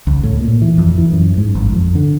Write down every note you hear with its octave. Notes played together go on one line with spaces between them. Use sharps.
C#2
A2
A#2
E3
F2
E3
F#2
G#2
G#1
F2
D3